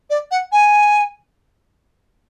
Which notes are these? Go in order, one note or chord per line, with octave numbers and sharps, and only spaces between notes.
D5
F#5
G#5